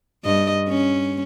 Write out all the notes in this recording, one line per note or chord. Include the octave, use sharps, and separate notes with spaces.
G2 D#5
C#4